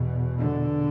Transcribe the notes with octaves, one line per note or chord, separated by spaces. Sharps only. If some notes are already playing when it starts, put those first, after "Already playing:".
Already playing: E2 B2
D3